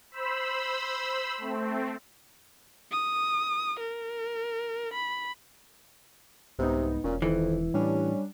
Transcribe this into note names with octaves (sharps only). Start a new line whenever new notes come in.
C5 B5 E6
A3 C4
D#6
A#4
B5
C2 G#2 C3 B3 D#4
E1 A#2 C#4
F2 D#3 E3
A2 G3 C#4 D4